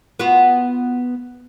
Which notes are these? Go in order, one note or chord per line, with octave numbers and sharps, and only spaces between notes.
B3 F4 F#4